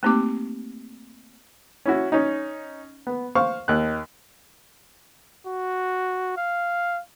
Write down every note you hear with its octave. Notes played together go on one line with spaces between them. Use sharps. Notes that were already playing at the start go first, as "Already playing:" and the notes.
A3 A#3 C4 D#4 G4 D6
C#4 E4 F#4
C#4 D#4
B3
C5 F5 C#6
D#2 F#6
F#4
F5